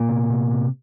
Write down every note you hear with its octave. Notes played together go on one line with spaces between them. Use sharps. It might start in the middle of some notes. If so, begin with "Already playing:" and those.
Already playing: A#2 A#3
C3
C3
C3